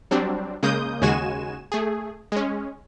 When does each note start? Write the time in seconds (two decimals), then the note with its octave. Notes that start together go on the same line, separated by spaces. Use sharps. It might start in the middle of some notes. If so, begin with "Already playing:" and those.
0.11 F#3 G3 C4 D4
0.63 C#3 G#3 A#3 D#6 G6
1.02 D#2 C#3 G#3 F#4 G#5 E7
1.72 A3 G#4
2.32 G#3 C#4